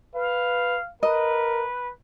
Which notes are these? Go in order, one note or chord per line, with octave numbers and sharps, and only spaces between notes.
B4 F5
A#4 B4 D#5